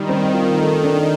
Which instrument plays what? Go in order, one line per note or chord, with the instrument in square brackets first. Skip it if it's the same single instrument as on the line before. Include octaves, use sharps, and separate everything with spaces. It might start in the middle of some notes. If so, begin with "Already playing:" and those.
Already playing: [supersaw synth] D#3 [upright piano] G3
[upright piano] C4
F4
A3
D4